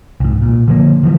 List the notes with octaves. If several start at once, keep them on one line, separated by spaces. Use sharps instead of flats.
C2 G#2
A#2
D3 F3 A#3
D3 E3 F3 G3